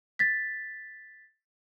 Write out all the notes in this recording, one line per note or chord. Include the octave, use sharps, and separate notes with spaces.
A6 B6